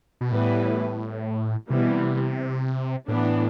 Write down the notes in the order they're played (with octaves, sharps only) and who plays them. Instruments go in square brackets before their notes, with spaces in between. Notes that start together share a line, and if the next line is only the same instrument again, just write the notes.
[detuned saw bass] B2
[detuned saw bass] A2 [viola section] E3 G3 B3 E4 B4
[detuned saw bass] C3 [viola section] E3 G3 B3
[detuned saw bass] B2
C3
[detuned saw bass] A2 [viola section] E3 B3 D4